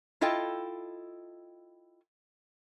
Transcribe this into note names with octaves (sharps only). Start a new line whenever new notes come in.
E4 F4 A4 D#5 G5